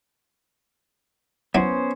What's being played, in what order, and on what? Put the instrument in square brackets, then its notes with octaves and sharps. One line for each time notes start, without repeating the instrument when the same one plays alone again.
[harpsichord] F#3 E4 [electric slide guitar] B3 C#4 C5